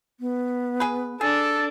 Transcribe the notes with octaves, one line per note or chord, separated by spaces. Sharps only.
B3
G#4 B4
D4 G#4 A4